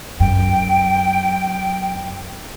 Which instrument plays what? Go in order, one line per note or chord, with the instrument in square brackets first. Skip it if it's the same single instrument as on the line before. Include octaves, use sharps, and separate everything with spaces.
[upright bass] F#2 [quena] G5